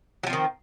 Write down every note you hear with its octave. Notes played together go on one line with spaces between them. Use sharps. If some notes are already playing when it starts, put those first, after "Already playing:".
D#3 F3 F#3 C4